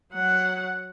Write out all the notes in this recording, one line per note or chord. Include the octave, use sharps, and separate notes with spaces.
F#3 F#5